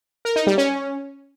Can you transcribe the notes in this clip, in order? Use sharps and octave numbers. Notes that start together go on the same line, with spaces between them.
A#4
D#4
G3
C#4